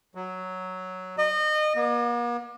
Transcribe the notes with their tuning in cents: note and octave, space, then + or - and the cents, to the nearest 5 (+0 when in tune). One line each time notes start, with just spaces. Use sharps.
F#3 +5
D#5 -30
A#3 +45